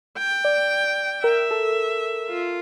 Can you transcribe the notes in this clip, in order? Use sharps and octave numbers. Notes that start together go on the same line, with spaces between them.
G5
D5
A#4 E5
A4
F4